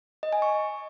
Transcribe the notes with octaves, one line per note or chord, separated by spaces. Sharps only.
D#5
G#5
C#6